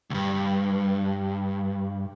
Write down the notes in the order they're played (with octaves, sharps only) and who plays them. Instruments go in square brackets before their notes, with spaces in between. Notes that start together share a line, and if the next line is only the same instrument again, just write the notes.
[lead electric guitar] C#2 G2